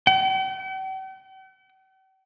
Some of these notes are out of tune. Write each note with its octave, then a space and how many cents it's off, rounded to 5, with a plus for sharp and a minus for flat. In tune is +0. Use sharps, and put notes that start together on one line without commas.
G5 -45